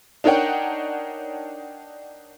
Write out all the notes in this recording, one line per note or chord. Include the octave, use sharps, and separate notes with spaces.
D4 D#4 A#4 C#5 F#5 G5